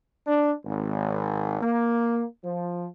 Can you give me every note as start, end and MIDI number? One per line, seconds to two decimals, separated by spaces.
0.27 0.52 62
0.65 1.60 32
1.62 2.23 58
2.45 2.86 53